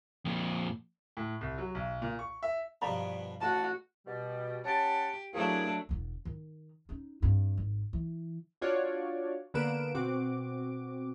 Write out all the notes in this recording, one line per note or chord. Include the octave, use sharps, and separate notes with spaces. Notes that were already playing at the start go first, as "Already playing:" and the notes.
F2 A#2
A2
C2
F#3
B1
A#2
C#6
E5
G2 B2 F3 D5 A#5 B5
A1 F#4 A5
B2 G3
C#4 G4 F#5 A5
F#3 A3 A#3 D4 E4 G#4
E1 B3
D#3
C#4 D#4
G2 C4
G#1
E3
D4 F4 F#4 C#5 D5
D3 A#3 B3 B4 D7 E7
B2 C4 F#4 D6